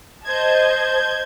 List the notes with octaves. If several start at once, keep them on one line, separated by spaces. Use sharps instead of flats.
C5 D#5 A5 G6 G#6